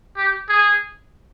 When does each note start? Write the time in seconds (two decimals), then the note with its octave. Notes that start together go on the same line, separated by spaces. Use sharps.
0.17 G4
0.49 G#4